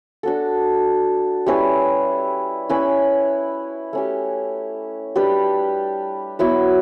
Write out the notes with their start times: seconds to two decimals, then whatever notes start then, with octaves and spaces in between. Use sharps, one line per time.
0.23 D4 F#4 A4
1.46 G3 C#4 E4 B4
2.69 C#4 E4 B4 E5
3.93 A3 C#4 G4
5.16 G3 D4 G4 B4
6.39 F#3 B3 E4 B4